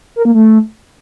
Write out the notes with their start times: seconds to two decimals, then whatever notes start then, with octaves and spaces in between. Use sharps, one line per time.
0.16 A#4
0.25 A#3
0.34 A3